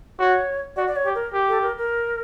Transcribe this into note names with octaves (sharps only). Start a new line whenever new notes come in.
F#4 C#5
F#4 D5
D5
C#5
G4
A#4
G4
A4
A#4
A#4